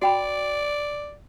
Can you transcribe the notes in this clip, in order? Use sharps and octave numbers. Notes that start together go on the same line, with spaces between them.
F#4 D5 G5 B5